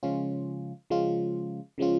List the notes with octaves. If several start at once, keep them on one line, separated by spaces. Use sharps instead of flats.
C#3 F3 G#3 C#4 F4
C#3 F3 G#3 C#4 F4
C#3 F3 G#3 C#4 F4